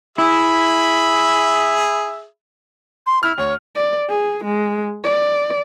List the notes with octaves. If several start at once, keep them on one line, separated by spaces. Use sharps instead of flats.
E4 G#4 E5 B5
C6
E4 F6
D2 C#5
D5
G#4
G#3
D5